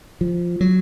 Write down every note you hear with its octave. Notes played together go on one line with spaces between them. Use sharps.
F3
F#3